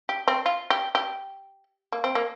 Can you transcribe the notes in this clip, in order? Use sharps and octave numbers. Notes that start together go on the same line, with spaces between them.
G4
C4
F4
G4
G4
A#3
C4
A#3